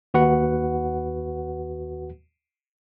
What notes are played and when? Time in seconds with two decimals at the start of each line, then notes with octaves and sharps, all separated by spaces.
0.14 D#2 F#4 B4 F#5